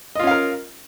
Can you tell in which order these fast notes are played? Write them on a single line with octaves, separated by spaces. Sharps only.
D#5 F4 C#4 F5 A#4